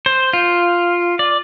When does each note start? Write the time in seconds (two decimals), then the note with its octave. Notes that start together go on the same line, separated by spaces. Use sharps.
0.06 C5
0.33 F4
1.19 D5